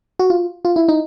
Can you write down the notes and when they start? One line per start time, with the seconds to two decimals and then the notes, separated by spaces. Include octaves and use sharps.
0.19 F#4
0.30 F4
0.65 F4
0.76 E4
0.88 D#4